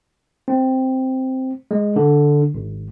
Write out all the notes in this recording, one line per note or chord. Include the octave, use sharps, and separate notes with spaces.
C4
G#3
D3
G#1